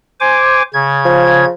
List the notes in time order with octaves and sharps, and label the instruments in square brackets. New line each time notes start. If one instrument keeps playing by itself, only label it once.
[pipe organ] C5 G#5 D6
C#3 G#6
[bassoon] F3